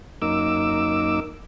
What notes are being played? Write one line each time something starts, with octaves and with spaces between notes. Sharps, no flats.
F#2 A#3 D#4 D6 E6